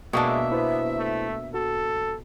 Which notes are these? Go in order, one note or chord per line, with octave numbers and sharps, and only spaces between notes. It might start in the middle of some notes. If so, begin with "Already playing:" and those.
B2 G#3 A#3 D4 E5
B3 E4 B4 C5
A3
F#4 A4